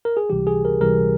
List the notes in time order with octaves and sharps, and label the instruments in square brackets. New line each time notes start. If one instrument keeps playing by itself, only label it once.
[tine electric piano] A#4
G#4
C#2 C3 E3 G3 G4
G#4
A#4
C#2 C3 E3 G3 A#4